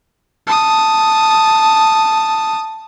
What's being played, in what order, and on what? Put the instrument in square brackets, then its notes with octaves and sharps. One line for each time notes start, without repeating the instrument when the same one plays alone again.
[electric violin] A5 D#6